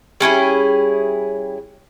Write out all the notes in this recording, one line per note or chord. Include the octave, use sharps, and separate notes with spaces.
G3 C#4 E4 G#4